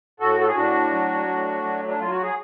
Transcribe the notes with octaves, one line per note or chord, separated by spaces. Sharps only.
A2 F#4 A4
A4
G#4
A2 D4 F#4
F#3
A2
F#3
D4
F#3 F4
F#4
G#4